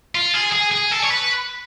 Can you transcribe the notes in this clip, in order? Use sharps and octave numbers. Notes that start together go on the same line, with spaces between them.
F4
G#4
G#4
G#4
A4
C#5
B4